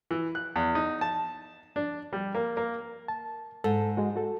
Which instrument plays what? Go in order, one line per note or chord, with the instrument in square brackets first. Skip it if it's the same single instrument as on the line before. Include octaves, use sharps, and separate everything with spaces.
[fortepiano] E3
F#6
E2
D#4
A5
D4
G3
A#3
A#3
[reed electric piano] A5
[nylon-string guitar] G#2 [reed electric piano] A4
[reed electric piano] G#3 F#4
F#4 A4